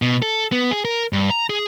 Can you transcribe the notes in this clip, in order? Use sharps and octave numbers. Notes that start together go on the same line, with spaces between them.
B2
A4
B3
G#4
A#4
G2
A#5
G#4